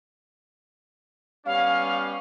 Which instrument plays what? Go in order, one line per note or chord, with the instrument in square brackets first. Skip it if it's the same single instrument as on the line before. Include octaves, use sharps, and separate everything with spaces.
[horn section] G3 B3 C#4 [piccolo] F5